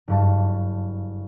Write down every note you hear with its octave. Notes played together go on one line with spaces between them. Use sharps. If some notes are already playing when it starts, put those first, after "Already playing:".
F#1 G2 A5